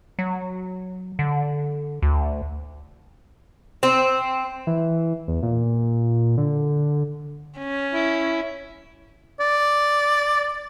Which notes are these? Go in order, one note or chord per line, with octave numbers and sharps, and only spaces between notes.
F#3
D3
D2
C4
E3
E2
A#2
D3
C#4
E4
D5